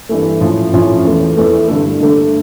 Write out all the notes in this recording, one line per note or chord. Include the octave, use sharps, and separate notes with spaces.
G2 E3 A3
A2 F3 C#4 F4
A2 F3 C#4 F4
E2 E3 A3
E2 E3 A3
G2 D3 A3
G2 D3 A3